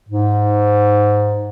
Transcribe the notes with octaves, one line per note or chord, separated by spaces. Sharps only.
G#2